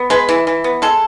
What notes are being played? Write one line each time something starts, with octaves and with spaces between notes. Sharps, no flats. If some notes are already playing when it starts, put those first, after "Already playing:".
Already playing: B3
G#3 B4
E3
E3
B3
G#3 A4